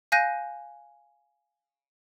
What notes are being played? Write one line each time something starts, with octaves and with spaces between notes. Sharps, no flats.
F5 G#5 F#6 G6 A#6 D#7